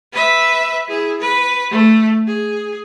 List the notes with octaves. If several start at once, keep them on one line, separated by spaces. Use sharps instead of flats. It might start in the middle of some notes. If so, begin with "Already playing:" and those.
B4 E5
E4 G#4
B4
A3
G#4